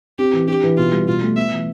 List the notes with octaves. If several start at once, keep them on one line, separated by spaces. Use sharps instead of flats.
C4 G4
E3
D4 G4
E3
B2 F4
G3
B2 F4
A3
B3 E5
E3